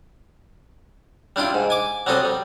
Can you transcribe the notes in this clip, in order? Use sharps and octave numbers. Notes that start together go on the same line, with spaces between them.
G3 D4 E4 F4 G5
G#2
G#5 D6
F#3 G3 C4 A4 D#5
G3